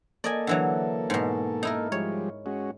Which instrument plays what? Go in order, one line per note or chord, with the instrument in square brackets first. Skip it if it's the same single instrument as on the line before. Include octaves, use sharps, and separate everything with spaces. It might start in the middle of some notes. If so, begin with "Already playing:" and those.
[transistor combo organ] A#3 A4 [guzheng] D5 D#5 G#5
[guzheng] D3 E3 F#3
G#2 B2
D#4 E4 A#4
[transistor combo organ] F3 G3 G#3 [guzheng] C#5
[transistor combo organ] G#3 C#4 F#4